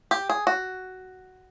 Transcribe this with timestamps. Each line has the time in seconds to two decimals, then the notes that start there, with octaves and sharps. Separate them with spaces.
0.11 G4
0.29 G#4
0.47 F#4